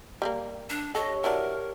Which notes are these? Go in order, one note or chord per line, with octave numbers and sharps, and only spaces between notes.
G3 G#3 A#3
D4
G4 A4 C#5 D#5
E3 F#3 D4 A#4